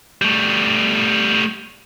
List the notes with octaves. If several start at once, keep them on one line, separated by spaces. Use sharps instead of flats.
G3 A3